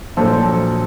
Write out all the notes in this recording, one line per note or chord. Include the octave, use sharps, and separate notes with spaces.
A#1 A#2 F#3 A4 C5